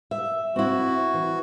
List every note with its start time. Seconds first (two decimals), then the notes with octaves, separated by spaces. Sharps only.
0.11 E5
0.56 C4 E4 F#4
1.14 E3